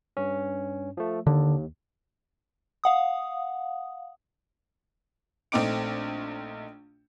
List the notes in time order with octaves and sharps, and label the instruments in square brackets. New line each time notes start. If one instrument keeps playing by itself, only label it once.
[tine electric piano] G2 C#4
F3 A3
[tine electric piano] D#2 [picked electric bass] D3
[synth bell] F5 F#5 D#6
[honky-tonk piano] A#1 A3 C4 D#4 D6 D7